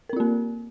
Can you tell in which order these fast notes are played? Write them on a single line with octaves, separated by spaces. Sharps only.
A#4 C4 F4 A#3